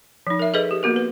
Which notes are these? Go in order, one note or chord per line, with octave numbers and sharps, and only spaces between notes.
F3 D#4
A#4 E5
G#4 A4 B4 D#5
G4
A#3 B3 F#4 A#4
B4